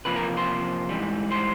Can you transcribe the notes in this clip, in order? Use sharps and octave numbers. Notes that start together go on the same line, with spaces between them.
E2 C3 F3 A#3 B4 B5
A#4 A#5
C5 C6
G#2 E3 G3
C5 C6